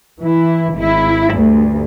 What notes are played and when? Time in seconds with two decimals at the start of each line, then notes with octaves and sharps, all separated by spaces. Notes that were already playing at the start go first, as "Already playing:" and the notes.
0.20 E3 E4
0.74 G#1 E4
1.32 D2 G2